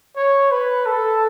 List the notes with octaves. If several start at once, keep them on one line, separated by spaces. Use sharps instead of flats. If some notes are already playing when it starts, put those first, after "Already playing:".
C#5
B4
A4